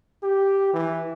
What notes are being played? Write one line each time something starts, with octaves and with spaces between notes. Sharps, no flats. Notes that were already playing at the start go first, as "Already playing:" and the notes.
G4
E3